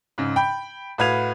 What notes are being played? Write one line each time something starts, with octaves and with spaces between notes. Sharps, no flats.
G#2 C#3
G5 B5
A2 F#4 B4 F5 G#6 F7